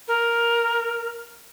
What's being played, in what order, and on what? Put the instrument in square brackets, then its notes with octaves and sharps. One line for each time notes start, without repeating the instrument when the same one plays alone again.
[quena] A#4